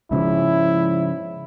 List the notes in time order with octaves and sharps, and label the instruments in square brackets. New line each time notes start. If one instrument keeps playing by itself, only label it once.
[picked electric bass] G#2 C#3 F3 [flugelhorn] E4